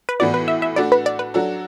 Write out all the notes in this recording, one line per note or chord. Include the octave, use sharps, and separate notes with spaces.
B4
A2 E3 B3 F#4 D5
B4
E5
E5
A3 D4 F#4 A4 D5
B4
D5
B4
F#3 D4 F#4 A4